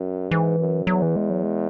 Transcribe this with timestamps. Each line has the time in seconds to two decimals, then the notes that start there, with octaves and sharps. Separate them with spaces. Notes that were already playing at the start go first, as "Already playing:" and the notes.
Already playing: F#2
0.31 G#2 E3
0.59 F#2
0.87 E2 F#3
1.02 E3
1.16 G#3
1.30 F#3
1.44 G#3